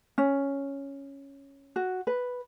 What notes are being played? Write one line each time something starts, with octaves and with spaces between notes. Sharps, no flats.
C#4
F#4
B4